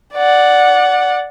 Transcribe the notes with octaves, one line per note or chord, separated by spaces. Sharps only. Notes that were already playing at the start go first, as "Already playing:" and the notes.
D5 F#5